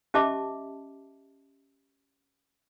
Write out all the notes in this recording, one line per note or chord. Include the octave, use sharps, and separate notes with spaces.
C#4 G4 D#5 E5 A5 D6